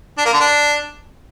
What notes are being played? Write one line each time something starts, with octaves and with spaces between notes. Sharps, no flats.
D4
A#3
D3
D4